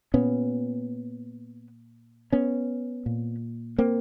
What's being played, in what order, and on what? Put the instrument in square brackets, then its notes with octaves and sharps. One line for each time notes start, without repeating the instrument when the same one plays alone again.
[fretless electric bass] A#2 B3 C#4
B3 C#4
A#2
A#3 C4